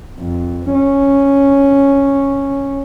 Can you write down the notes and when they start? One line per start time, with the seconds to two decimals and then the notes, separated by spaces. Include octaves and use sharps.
0.21 F2
0.74 C#4